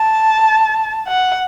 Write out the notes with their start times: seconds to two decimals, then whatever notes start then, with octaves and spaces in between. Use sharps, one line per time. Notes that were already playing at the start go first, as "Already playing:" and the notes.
Already playing: A5
1.07 F#5